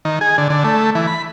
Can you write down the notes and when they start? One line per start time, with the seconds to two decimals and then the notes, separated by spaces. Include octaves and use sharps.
0.05 D#3
0.21 G#4
0.38 D3
0.50 D3
0.64 A3
0.95 E3
1.07 B5